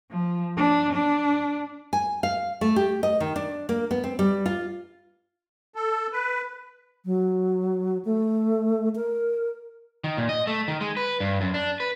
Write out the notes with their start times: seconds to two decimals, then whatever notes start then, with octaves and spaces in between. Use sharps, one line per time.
0.11 F3
0.57 D4
0.93 D4
1.93 G#5
2.23 F5
2.61 A3
2.76 G4
3.03 D#5
3.20 D#3
3.36 D4
3.69 A#3
3.91 B3
4.04 C4
4.19 G3
4.46 F4
5.75 A4
6.12 B4
7.05 F#3
8.05 A3
8.96 A#4
10.04 D#3
10.17 A#2
10.29 D#5
10.47 A3
10.68 D#3
10.81 G#3
10.97 B4
11.20 G2
11.41 F#2
11.54 D4
11.80 B4